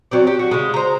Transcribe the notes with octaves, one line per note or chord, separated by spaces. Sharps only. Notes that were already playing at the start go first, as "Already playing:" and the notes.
F#3 C4 D5
G4
F#4
C#3 G#3
C5 A#5